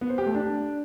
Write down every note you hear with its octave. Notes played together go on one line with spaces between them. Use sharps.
B3
C5
G4
A3
D4